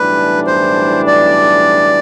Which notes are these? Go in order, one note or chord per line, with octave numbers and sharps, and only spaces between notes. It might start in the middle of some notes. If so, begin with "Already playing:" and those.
Already playing: B1 A2 E3 G3 D4 B4
C5
D5